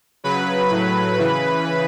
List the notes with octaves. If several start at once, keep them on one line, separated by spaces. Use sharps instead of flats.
C#3 F#3 B4 B5
A2 F#3
C#3 E3